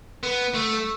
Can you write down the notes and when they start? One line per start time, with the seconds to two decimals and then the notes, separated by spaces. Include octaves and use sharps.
0.23 B3
0.55 A3